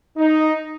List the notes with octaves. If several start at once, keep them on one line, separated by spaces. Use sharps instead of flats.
D#4